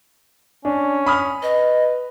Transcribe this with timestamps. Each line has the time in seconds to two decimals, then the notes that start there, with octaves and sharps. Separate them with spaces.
0.65 C#4 D4
1.06 B5 D#6 F6
1.43 B4 D#5